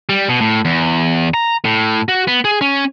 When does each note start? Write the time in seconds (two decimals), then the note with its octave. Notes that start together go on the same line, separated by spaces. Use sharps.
0.09 G3
0.29 B2
0.41 A2
0.65 E2
1.34 A#5
1.65 A2
2.09 F#4
2.27 B3
2.45 G#4
2.61 C#4